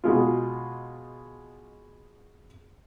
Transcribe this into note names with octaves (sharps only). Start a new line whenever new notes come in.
B2 G#3 F4